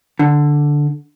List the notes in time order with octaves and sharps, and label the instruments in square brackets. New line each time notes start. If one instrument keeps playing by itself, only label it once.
[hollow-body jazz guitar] D3